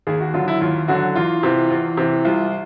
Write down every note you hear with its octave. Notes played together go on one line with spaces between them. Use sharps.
D#2 G#4
F#4
D3 F#3 F4
E4
D#2 F4
D3 F#3 F#4
E2 F4
C3 E3
E2
C3 E3
C2 F4